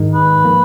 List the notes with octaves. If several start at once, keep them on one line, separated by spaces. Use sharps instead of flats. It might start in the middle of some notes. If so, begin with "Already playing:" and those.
Already playing: G#2 D#3 G#3 D#4
B4
F3 A#3